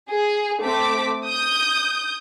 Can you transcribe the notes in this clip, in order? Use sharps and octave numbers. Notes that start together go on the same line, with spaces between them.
G#4
A3 C4 D6 B6
D#6 G6